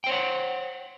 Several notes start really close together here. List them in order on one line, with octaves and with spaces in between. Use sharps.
G5 C5 C#5 F#5